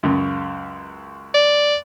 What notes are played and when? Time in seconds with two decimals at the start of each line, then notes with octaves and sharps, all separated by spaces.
0.03 C#2 F#2 C#3
1.35 D5